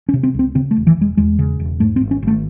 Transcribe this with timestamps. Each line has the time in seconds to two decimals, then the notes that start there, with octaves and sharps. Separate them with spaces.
0.09 C#4
0.14 C3
0.23 C4
0.34 C#2 C4
0.55 C#3 C4
0.71 A3
0.76 E1
0.87 E3
0.96 E1 G#3
1.17 E2 G#3
1.39 C#3
1.60 E1
1.80 G#2 A3
1.96 C4
2.01 G#1
2.11 C#4
2.22 G#1 A3